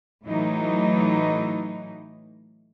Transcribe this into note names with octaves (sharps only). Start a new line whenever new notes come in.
A2 E3 F#3 A3 D#4